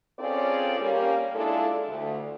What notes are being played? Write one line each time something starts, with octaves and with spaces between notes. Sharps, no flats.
C4 C#4 F4 G#4 A4 D5
G3 A#3 C#4
G#3 D4 E4 F4 A4
D2